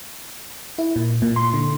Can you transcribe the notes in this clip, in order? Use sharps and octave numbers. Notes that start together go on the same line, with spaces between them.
E4
A#2
A#2
C6
D3